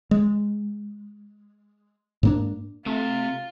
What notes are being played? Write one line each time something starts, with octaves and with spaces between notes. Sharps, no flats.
G#3
G#2 A#3 D4
C3 A3 F4